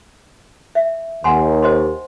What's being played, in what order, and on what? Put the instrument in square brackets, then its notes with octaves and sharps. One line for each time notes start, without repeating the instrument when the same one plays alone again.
[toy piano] E5
[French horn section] D#2 [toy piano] F#5 G#5 C6
[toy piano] C5 D#5 C6